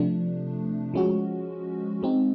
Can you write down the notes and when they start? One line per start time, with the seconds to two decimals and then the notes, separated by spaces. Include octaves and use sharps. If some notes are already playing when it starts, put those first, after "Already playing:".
Already playing: C3 F3 A3 D4
0.94 F3 G#3 C#4 F#4
2.03 G#3 C4 D#4